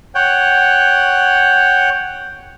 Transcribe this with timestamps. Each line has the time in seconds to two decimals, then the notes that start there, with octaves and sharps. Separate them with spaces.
0.15 C#5 F#5 G5